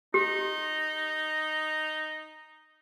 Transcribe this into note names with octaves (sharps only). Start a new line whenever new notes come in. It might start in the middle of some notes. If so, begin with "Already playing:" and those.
D#4 G4